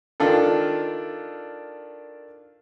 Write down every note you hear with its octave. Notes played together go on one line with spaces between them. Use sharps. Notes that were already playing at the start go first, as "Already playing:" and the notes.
D#3 D4 F4 A4